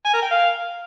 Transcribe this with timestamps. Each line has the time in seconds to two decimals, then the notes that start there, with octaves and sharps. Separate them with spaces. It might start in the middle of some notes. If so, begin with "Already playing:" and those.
0.05 G#5
0.14 A#4
0.22 G5
0.31 F5